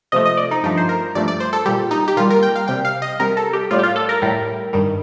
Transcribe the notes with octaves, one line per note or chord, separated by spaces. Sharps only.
C3 F3 A3 D#5
D#5
D5
D#4
G2 F3 A3 D#4
C5
A#4
G2 F3 A3 D5
D5
C5
A4
A#2 G3 G4
D#4
G4
A#2 G3 F4
A#4
G5
F5
C3 G3 G5
F5
D#5
C3 G3 A#4
A4
G4
A2 G3 F4
G4
F4
A4
A#4
A2 G3
G2 D#3 G3